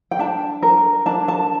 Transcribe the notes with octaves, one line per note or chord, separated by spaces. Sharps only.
G5
D4 A5
A#4
D4 A5
A5